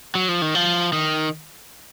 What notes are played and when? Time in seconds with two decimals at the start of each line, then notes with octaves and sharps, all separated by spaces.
0.15 F#3
0.28 F3
0.42 D#3
0.55 F3
0.93 D#3